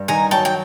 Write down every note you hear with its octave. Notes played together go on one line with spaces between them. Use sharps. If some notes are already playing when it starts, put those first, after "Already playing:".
Already playing: G2
D#3 G#5 A#5
F#3 G5 A5
G5